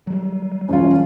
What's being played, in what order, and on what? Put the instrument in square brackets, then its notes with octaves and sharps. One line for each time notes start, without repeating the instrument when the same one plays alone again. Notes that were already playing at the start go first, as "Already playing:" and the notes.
[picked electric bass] F#3 G3
[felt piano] E1 F4 [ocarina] C#4